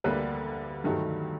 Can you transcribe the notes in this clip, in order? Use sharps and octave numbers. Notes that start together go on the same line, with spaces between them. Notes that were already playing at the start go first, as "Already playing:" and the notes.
D2 D3 G3 A#3 B4
G2 D#3 F#3 A3